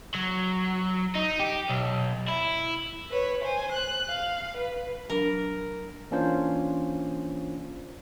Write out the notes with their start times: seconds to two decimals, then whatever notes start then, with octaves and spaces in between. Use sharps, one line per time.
0.15 F#3
1.15 D#4
1.39 G4
1.69 B1
2.28 E4
3.10 B4 C#5
3.42 C5 G#5
3.72 F#6
4.09 F5
4.57 B4
5.10 F#3 D4 A#4 B5
6.11 E3 A#3 C#4 D4 F4 C5